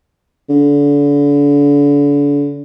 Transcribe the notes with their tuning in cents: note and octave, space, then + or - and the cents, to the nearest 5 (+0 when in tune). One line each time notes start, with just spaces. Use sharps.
D3 -35